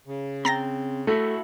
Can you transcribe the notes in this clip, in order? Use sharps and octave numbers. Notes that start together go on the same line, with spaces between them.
C#3
C4 G5 A#5 A6 A#6
A3 E4 F#4 A4